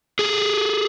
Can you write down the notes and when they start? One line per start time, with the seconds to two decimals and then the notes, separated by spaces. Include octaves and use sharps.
0.19 G#4 A4